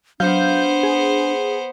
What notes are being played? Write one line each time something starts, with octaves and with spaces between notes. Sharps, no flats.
F#3 B3 D4 C5 F5 G6
G#4